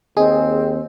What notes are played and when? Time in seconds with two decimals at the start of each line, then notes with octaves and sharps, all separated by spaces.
0.17 D#2 C4 G#4 D#5